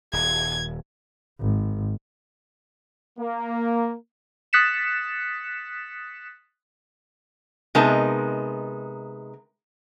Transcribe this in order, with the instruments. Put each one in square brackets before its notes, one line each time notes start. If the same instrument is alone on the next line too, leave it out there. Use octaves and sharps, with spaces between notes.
[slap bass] D#1 [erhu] G#6
[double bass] G#1
[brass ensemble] A#3
[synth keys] D#6 F#6 A6 B6 C#7 E7
[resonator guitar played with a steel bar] C3 G#3 B3 D#4 A#4 A5